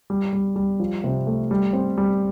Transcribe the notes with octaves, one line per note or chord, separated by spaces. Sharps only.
G3
G3
G3
F3
C3
A3
G3
C4
G3